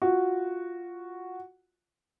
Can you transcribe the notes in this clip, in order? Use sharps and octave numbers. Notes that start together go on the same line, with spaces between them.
F4 F#4